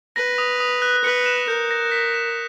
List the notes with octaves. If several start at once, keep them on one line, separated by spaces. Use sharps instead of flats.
B4 A#6
D#6
D#6
F#6
B4 C#7
E7
A#4 G6
A#6
B6
E7